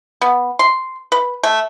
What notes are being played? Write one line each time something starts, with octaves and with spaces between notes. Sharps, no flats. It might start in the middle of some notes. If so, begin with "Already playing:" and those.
B3
C6
B4
A3